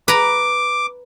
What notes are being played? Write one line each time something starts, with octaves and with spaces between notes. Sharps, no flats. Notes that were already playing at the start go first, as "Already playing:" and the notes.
B4 A#5 D6